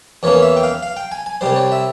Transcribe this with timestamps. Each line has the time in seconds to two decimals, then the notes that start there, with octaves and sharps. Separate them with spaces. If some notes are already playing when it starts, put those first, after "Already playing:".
0.23 E2 E3 A#3 C#4 C#5
0.42 E5
0.57 G5
0.63 F5
0.83 F5
0.97 G5
1.12 G#5
1.26 G#5
1.41 C2 C3 G3 C5
1.56 C#5
1.72 E5